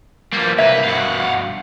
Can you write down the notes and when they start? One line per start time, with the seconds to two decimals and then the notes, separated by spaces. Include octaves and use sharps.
0.32 E3 F3 G3 A#3
0.59 C2 A#3 B4 E5 G#6
0.84 G2 B2 F5 F#5